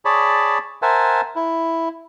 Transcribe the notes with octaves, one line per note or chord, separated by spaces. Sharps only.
G#4 C#5 D5 A5 B5
A#4 C5 E5 F#5 G#5 A5
E4